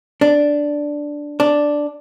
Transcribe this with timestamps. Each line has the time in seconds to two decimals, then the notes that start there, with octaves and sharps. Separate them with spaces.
0.21 D4
1.40 D4